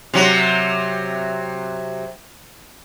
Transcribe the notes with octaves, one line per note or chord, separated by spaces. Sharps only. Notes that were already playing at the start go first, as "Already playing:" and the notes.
C3 F#3